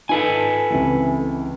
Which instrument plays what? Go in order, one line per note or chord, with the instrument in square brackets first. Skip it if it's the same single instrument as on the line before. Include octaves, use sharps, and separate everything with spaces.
[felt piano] D#4 F4 [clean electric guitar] A4 B4 G#5
[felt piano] C#2 C3 E3